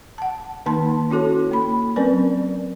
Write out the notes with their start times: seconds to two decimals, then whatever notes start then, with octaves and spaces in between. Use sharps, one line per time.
0.18 F#5 A5
0.66 D#3 A#3 D#4 A5 C6
1.11 C#4 E4 F#4 A4 C#5
1.51 A#3 B5
1.96 F#3 C4 C#4 A#4 B4 D5